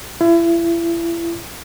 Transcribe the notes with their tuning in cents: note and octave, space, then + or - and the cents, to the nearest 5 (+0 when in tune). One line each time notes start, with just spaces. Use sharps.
E4 +35